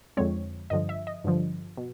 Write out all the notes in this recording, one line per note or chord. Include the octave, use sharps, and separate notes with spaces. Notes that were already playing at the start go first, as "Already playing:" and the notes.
F2 D3 F3 G#3 C4 C#5
G2 D3 F3 D#5
E5
D#5
G2 D3 F3
B2